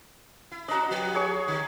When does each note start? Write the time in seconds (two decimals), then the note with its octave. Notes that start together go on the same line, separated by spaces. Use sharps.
0.51 E4
0.68 C#4 D4 F#4 D#5 A#5
0.91 F3 G4 B4
1.15 G#4 C#5 C#6
1.48 D3 D#4